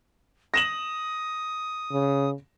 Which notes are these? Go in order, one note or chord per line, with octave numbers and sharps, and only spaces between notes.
D#6 A#6 E7 F#7
C#3